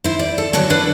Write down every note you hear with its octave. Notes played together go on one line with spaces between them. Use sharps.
E4 C5
D5
A4
G2 D3 F#3 C#5 A5
D4 B4 F#5